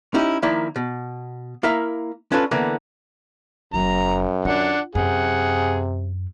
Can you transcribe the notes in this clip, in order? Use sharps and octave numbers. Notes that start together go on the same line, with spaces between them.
C#4 D#4 E4 G4
D#3 F3 A#3 E4 D5
B2
A#3 E4 A#4 E5 F5
C#4 D4 F4 A4 B4
D3 E3 A#3 B3
F#1 F#2 F#3 A#5
D4 F4 F#5
F#2 C3 C4 G#4 F#5